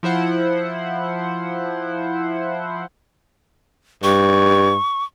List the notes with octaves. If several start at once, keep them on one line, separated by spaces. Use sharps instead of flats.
F3 E4 C5 F#5
G2 C#6